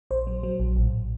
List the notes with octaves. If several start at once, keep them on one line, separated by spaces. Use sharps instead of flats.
A#1 C5
F#3
F#3
A#1
A1